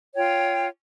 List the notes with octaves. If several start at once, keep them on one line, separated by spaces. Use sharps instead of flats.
F4 C#5 G5